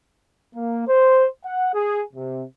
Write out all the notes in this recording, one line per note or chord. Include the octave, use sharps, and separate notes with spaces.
A#3
C5
F#5
G#4
C3